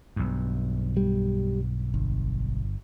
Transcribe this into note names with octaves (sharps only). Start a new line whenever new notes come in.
B1 G2
G3
G1